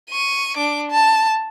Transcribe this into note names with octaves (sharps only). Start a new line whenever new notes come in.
C#6 D#7
D4 D6
A5